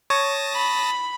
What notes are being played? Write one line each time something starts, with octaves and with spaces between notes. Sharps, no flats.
C#5 A5 D#6 A#6
B5